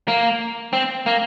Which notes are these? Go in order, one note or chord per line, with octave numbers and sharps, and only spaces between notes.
A#3
C4
A#3